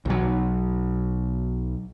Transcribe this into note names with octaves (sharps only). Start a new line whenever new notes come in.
B1 F#3